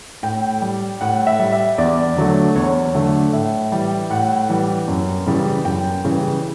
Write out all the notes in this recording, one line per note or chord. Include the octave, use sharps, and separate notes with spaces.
A2 G5
G3
A2 F#5
E5
G3
E5
E2 D5
D3 F#3 A3
E2 C#5
D3 F#3 A3
A2 E5
E3 G3
A2 F#5
E3 G3
F#2
C#3 E3 G3
F#2 G5
C#3 E3 G3